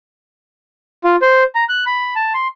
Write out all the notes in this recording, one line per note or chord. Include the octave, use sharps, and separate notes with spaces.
F4
C5
A#5
F#6
B5
A5
C6